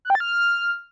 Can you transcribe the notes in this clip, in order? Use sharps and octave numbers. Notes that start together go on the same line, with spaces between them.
F#6
G5
A6
F6